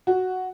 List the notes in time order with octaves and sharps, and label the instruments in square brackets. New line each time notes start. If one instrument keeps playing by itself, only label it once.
[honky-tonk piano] F#4